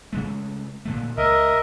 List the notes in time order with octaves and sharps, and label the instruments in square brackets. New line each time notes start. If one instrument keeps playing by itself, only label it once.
[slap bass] C#3 G#3 A3
A#2 D3 A3
[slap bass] C#2 [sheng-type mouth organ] A#4 D#5 E5